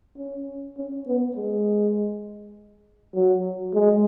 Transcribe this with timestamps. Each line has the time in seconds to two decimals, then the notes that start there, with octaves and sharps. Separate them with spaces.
0.18 C#4
0.78 C#4
1.07 B3
1.37 G#3
3.15 F#3
3.74 G#3